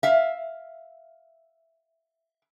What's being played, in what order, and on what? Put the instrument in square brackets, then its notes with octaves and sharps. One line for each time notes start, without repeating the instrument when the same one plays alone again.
[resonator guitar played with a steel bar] E5 F5